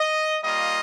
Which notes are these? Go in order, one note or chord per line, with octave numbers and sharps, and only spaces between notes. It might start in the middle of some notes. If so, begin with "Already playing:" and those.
Already playing: D#5
G3 A#3 F4 D#5